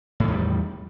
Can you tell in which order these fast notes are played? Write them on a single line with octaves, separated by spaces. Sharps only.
A2 D#3 E2 G3